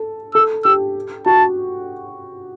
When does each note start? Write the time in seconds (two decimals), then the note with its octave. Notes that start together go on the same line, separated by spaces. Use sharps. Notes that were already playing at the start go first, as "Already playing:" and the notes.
Already playing: A4
0.34 A4 E6
0.65 G4 E6
1.26 F#4 A5